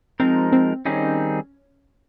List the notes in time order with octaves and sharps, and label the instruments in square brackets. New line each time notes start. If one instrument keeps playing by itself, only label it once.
[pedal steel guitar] F3 G#3 D#4 A#4 [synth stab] C4
[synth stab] C4
[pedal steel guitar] D#3 G3 C4 D#4 G#4 [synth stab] C#4